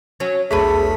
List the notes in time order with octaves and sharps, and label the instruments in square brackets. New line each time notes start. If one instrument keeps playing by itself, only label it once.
[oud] F#3 C#4
[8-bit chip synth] B1 E2 B6 [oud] F#3 D4 B4 [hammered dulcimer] A3 [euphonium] G#4